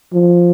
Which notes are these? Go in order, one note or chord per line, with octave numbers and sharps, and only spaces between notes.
F3